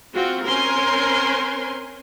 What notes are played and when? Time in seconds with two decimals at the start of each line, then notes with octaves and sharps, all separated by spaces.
0.12 C4 F4 F#4
0.45 C4 C#4 A#4 C5 G#5 C6